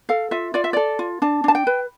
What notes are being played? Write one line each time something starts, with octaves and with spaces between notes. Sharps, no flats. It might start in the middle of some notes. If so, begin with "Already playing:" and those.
A4 F5
F4 E5
F4 D5
E5
A4 D5
F4
D4 A5
D4 A5
G5
B4